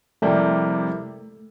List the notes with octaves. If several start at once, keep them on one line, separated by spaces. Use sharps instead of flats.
F2 C3 G3 A3 A#3 E4